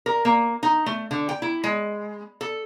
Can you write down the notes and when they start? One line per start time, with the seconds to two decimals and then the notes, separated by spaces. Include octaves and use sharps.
0.06 A#4
0.25 A#3
0.63 D#4
0.86 A3
1.11 D3
1.29 G5
1.42 E4
1.64 G#3
2.41 A4